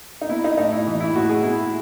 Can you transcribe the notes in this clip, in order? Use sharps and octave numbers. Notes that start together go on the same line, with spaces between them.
D#4
B3 E4
D#4
A2 D#4
E4
E3
E4
A2 F#4
G#4
B3 E4